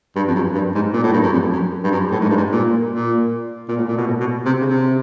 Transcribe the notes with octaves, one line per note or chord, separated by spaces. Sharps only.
G2
F2
F#2
G2
G#2
A#2
A2
G2
F#2
F2
F#2
G2
F#2
A2
G#2
G2
G#2
A#2
A#2
A#2
A2
A#2
B2
A2
B2
C3
C#3
C3